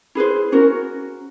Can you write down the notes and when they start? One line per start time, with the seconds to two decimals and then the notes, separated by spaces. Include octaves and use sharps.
0.15 E4 G#4 B4 C5
0.52 C#4 F#4 A#4